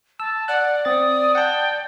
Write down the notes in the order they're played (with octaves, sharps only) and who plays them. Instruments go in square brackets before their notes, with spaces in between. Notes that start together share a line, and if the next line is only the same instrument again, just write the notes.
[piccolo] A5 [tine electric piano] E6
[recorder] D5 [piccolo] F#5 [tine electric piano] F#6
[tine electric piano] C4 A6 [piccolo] D#6
[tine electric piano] F#5 A5 [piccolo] G5